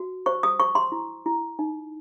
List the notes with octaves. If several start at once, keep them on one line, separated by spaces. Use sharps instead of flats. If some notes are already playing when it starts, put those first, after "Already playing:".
Already playing: F#4
C5 C#6
D#6
C5 C#6
C6
E4
E4
D#4